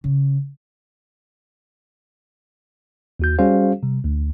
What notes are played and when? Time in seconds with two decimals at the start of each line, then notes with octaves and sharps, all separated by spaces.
0.04 C#3
3.20 D#2 F#4 G6
3.39 G3 C#4 F#4 G#4 C5 F5
3.83 C3 G3
4.04 D2